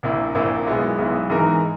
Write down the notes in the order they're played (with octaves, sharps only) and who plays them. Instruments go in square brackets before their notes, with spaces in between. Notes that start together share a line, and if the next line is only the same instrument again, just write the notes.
[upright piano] A#1 A#2 A#3 E4
A#1 A#2 A#3 E4
B1 B2 G#3 B3 E4
B1 B2 G#3 B3 E4
G#2 E3 G#3 D#4 A#4